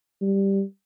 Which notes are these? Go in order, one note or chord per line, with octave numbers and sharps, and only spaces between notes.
G3